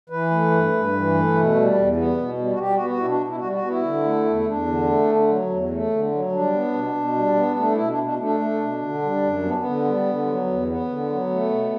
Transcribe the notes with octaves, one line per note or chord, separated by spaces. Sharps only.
E3 B4
A3
G2
G2
E3
A3
B2
G3
E2
B3
B2
G3
F#4
G3 G4
B3 F#4
F#4
B2 E4
D4
B2
E4
G3 F#4
F#4
B3
E4
D3
A3
E2
E4
E2 D4
D3
A3
D3
F#3
E2
A3
D3
F#3
G3 D4
B3
B2
B2
G3
B3
A3 D4
E4
B2
D4
B2
D4
A3 D4
A3
B2
D3
G3
F#2
B3
C#4
B3
D3
G3
D3
F#3
E2
B3
D3
F#3
A3
B2